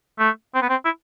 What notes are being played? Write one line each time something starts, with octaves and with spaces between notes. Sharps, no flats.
A3
C4
B3
C4
E4